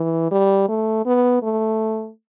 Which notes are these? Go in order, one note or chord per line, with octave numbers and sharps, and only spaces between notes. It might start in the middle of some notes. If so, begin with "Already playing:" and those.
Already playing: E3
G3
A3
B3
A3